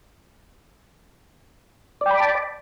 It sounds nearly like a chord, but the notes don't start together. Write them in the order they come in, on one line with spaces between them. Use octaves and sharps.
D5 G5 B5 D6 A5